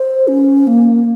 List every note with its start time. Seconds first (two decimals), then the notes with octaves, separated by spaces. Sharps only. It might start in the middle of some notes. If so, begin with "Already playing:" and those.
Already playing: C5
0.28 C#4
0.67 A#3